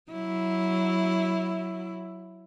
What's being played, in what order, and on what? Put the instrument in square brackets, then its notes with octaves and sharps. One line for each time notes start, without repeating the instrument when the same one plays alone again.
[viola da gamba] F#3 E4